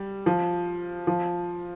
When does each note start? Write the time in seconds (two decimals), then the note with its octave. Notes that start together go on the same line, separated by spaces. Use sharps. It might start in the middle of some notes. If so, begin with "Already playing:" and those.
Already playing: G3
0.26 F3
1.07 F3